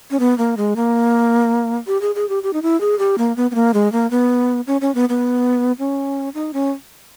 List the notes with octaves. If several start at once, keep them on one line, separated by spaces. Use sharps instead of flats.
C#4
B3
A#3
G#3
A#3
G4
G#4
G#4
G4
G4
D#4
E4
G#4
G4
A#3
B3
B3
A#3
G#3
A#3
B3
C#4
C#4
B3
B3
C#4
D#4
C#4